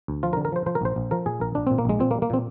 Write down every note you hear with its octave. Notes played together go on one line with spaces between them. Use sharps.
D2
F3 F4
A#4
D3
A#4
F3 C5
F3 C5
A#4
A#1 C5
A#1
F3 A#4
A#2 G#4
A#1 A#4
A#1 D4
A#2 C4
A#3
A#1 G#3
A#2 C4
A#3
G3
A#3
A#2 C4